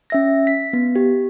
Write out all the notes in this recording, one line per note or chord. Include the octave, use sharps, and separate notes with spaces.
C#4 E5 A#6
B6
B3
G4